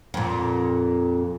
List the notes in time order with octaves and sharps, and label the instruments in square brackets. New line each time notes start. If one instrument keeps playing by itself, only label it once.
[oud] F2 A#2